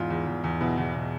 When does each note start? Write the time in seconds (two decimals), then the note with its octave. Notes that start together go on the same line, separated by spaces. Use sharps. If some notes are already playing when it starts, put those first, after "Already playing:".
Already playing: E2 G#2 F4
0.10 E2
0.27 E2
0.44 E2
0.61 B2 E4
0.78 E2
0.95 B2